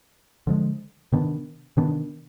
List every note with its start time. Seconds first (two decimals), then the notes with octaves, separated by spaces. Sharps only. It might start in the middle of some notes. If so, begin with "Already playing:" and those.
0.47 D3 F3 G#3
1.12 C3 D#3 B3 D4
1.77 C3 D#3 B3 D4